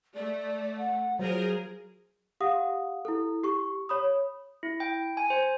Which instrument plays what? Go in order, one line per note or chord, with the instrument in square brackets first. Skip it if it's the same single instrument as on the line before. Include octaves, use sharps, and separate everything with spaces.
[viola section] A3 [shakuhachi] D5
[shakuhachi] F#5
[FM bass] F#3 [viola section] F4 G#4 A#4 [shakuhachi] C5
[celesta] G4 F5 F#5 D#6
E4 A4
G4 C#6
C#5 B5 D#6
[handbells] E4
G5
G#5
C5